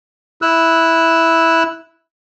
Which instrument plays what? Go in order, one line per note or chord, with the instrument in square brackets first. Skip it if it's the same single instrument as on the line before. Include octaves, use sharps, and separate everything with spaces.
[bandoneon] E4 E6 F#6